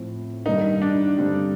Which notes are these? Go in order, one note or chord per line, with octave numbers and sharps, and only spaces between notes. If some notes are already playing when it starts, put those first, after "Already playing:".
Already playing: A2 F3 C4
G2 D#3 G3 A#3 D#4
D4
G2 D3 G3 C4